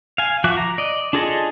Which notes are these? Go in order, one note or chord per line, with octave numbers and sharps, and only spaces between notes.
F5 G#5
F3 F#4 E5 D6 F#6
A#5
D5 D#5
D4 F4 G#4 A4 D#5